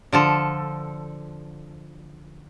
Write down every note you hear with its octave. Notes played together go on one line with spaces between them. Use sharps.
D3 F3 A4